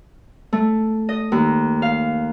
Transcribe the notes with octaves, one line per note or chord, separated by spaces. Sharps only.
A3
D#5
D#2
F5